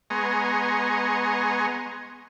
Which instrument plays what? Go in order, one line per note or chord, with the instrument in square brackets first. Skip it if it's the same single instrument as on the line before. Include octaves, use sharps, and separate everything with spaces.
[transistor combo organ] G#3 B3 G#5 A#5 C6 C#6